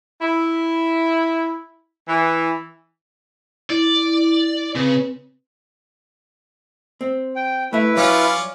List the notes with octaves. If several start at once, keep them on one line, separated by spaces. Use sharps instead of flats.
E4
E3
E4 D5
C#3 C4 B4
C4
G5
A3 E4 B4 E5
F#3 C#4 F4 D5